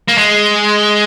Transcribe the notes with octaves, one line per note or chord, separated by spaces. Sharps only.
A#3
G#3